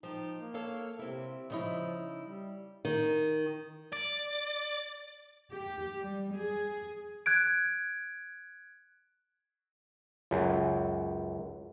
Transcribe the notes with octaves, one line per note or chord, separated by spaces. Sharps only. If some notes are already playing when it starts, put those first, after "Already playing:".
F3 D#4 G4
A#3
A4 C#5 F5
C3 C4 E4
C#3 F3 D#4 E4
G3
D#3
D5
G4
G3
G#4
F#6 G#6 D7
C#2 F#2